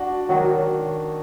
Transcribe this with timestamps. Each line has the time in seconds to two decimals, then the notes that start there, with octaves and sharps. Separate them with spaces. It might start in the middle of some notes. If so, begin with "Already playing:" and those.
Already playing: D4 F#4
0.29 D#3 F#3